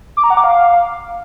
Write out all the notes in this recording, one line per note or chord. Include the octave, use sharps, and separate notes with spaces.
D6
A#5
F#5
D6
F5